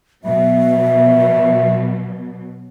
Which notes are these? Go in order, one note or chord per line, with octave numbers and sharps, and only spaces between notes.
B2 F#3 E5